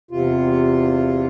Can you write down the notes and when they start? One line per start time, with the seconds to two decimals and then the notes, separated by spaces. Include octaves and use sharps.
0.11 E2 C3 F4